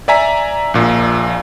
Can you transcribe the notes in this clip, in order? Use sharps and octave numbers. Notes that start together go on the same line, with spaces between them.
D5 E5 G#5 A#5 B6
A#1 A#2